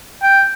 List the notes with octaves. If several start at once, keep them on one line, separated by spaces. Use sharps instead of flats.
G5